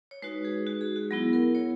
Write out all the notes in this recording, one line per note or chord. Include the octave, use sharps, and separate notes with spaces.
C#5
G#3 D#4 F#4 B4
G#4
F#4
G#4
F#4
F#3 B3 E4 G#4
A#4
C#5